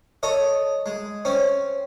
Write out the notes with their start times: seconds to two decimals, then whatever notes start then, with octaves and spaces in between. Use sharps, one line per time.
0.23 A4 C#5 D#5
0.86 G#3
1.25 C4 C#4